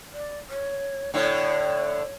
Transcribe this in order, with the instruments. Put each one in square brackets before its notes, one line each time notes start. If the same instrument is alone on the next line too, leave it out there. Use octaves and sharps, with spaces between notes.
[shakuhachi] D5
C#5
[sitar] A2 D3 [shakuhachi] C#5